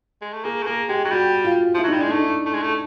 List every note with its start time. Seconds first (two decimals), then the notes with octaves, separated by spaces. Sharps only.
0.22 G#3
0.33 A3
0.45 A#3 G#4
0.63 A3
0.67 A#3 G#4
0.89 G#3 G4
1.05 F#3
1.12 G3 F#4
1.44 F4
1.74 F3 E4
1.84 F#3
1.88 G3 D#4
1.99 G#3 D4
2.09 A3 D#4
2.46 A3
2.54 G#3
2.62 A3